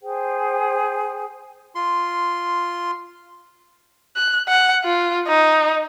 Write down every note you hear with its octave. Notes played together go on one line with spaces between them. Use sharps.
G#4 C5 G5
F4 C6
F#6
F#5
F4
D#4